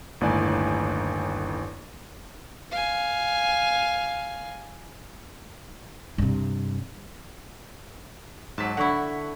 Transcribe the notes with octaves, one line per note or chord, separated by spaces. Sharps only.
G1 D#2 A2 D5 G#5
F5 G#5
G2 C3
G#2 F#3 A5 B6
D3 E4 F#5 C#6